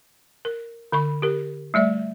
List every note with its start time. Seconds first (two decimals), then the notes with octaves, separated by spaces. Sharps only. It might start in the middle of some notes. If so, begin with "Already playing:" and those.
0.45 A#4
0.92 D3 B5 C#6
1.22 G4 A#4
1.74 G3 A3 D5 E5